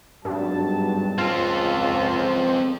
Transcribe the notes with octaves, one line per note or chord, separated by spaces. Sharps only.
G#1 G2 B2 F#3 A5
C#2 C4 F4 A4
C5